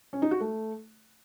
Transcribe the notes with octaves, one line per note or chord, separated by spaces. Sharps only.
C#4
D#4
F#4
A3